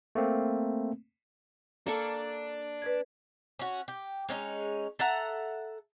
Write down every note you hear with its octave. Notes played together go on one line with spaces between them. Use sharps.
A3 A#3 C4
A#3 D4 A4 C#6
B4 D5 G#6
C#4 F#4
G4
G#3 C#4 D#4
A4 E5 F#5 A#5